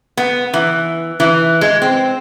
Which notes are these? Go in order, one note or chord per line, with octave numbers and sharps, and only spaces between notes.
B3
E3
E3
G#3
C4